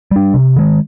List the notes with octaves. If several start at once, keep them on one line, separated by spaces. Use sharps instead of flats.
G3 D4
C3
D#3 G#3